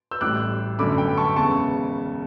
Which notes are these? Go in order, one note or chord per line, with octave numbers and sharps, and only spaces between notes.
E6 G6
A1 A2 G3 D6 F#6
G1 F#2 D3 A3 B5 D6
G5 B5
A5 C#6
E1 E2 C#3 A5 C#6